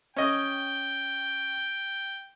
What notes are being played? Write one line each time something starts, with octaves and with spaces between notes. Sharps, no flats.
C#4 D#5 G5